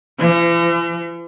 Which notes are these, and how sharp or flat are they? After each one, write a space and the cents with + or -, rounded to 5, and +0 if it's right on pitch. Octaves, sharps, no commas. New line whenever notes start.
E3 +45